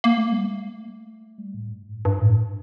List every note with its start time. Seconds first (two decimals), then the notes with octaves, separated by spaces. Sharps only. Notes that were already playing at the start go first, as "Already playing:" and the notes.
0.04 A#3
0.18 A3
0.32 G3
0.46 A3
1.38 G3
1.55 A2
1.72 G2
1.89 A2
2.05 G2
2.21 A2